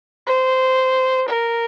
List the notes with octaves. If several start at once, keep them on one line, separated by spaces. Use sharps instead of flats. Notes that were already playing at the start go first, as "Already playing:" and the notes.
C5
A#4